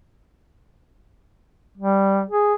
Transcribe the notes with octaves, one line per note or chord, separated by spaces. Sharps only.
G3
G#4